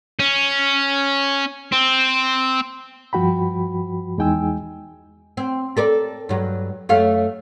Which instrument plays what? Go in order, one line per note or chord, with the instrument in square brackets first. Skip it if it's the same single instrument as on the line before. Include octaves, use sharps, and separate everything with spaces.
[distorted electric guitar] C#4
C4
[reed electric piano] G2 F3 F#4 G5 B5
E2 G#3 D#4 G5 G#5 E6
[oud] C4
A4 A#4 D5
G2 F#3
F#2 A3 F5